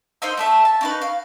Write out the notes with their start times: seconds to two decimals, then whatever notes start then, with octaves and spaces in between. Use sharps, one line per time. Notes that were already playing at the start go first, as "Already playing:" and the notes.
0.22 D#4 C5 D#5 E6
0.37 A3 A4 E5
0.65 A5
0.81 C#4 D#4 B4
1.02 F5